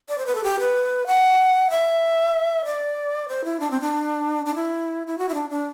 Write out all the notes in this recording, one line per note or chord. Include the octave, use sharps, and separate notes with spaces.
D5
C5
B4
A4
G4
B4
F#5
E5
D5
C5
E4
D4
C4
D4
D4
E4
E4
F#4
E4
D4
D4